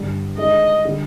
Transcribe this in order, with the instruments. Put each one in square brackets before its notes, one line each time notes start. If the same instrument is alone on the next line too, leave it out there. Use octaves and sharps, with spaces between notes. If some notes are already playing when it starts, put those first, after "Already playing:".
Already playing: [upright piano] G2 D3 G3
[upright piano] D#3 G#3 D4 G#4 [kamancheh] D#5
[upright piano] D3 G3